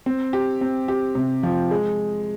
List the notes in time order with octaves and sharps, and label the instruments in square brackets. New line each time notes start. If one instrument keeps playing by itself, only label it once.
[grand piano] C4
G4
C4
G4
C3
F3
G#3